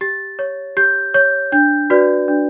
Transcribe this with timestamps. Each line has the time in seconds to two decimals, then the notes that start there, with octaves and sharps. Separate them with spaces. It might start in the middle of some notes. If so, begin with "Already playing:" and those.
0.01 G4 A6
0.39 C#5
0.77 G4 G6
1.14 C#5 G6
1.52 D4 G6
1.90 F#4 B4 D5
2.28 D4